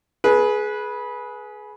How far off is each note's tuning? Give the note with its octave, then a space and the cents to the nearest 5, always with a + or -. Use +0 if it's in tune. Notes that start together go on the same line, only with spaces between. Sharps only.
G#4 +20 B4 -15